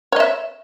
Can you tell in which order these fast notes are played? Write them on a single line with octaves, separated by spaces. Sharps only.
C#5 D#5 E5